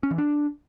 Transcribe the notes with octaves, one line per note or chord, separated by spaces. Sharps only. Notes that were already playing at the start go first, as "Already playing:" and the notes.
C#4
E3
D4